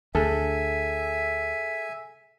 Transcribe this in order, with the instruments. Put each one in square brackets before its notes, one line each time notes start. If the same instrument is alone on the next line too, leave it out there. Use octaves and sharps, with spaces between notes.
[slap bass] D2 [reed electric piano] G#4 A4 [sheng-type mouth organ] E5 G#5